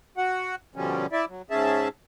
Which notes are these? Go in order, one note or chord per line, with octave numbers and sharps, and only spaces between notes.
F#4 F#5
B2 D3 F3 G3 C#4
E4 D5 E5
F#3
G#2 C#4 G#4 E5 A5